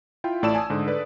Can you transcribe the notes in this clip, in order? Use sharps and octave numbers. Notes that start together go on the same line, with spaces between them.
E4 F4 G5
A1 A2 D5 A5 E6 E7
G#5 A5 D#6
G#2 D3
A4 B4 D5